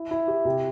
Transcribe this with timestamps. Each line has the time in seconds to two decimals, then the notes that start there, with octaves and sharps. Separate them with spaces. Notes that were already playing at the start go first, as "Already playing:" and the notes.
Already playing: E4
0.11 E4
0.28 G4
0.45 C3